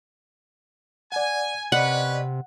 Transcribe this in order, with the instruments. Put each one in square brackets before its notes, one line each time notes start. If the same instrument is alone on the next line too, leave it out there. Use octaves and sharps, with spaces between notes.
[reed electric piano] D5 F#5 [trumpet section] G#5
[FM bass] C3 [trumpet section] C#4 B4 [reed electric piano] D5 D#5 [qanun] F#5